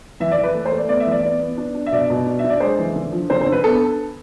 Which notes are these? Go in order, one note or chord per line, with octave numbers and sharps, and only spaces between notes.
E3 E5
D5
E3
B4
A3
C5
A3
D5
B3 D5
E5
E3
D5
B3 D5
B3
D4
D4
E5
B2 D5
B2
D4
E5
D4
D5
G#3 C5
E3
D3
F3
D3 C5
C5
D3
B4
B3 A4